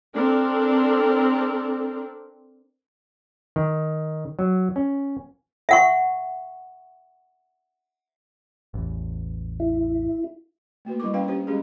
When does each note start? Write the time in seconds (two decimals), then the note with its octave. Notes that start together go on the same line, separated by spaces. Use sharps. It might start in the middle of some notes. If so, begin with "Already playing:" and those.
0.15 C4 D4 A4 A#4
3.56 D#3
4.39 F#3
4.76 C#4
5.69 E5 F#5 C#6
8.74 A1 E2
9.60 E4
10.85 A3 A#3 F#4 B4
11.00 G3 D4 E4 A#4 C#6 D6
11.13 C#4 D4 B4 F5 G5
11.28 C#4 G4 C5
11.47 G3 G#3 C#4 D4 G4 G#4